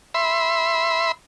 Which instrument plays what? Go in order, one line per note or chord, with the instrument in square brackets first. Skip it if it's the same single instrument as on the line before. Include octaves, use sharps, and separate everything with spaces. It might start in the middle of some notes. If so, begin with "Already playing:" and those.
[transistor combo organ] E5 B5 C6